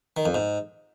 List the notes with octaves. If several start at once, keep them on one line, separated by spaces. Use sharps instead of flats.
D#3
F2
G#2